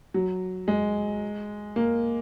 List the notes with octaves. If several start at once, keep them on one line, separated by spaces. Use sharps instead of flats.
F#3
G#3
A#3